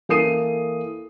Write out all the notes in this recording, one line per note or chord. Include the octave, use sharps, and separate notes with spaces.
E3 A#3 A4 D#6 C7 D#7